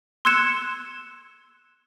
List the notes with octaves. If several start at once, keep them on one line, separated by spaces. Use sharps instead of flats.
C6 E6 F#6 G#6 C#7 E7